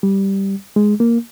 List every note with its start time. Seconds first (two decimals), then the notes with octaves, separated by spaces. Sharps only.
0.03 G3
0.76 G#3
1.00 A#3